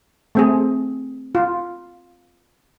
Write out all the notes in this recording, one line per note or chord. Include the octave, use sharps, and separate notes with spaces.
A3 C4 G#4
F4